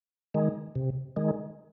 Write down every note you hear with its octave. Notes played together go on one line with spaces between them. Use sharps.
D#3 G#3
C3
D#3 G#3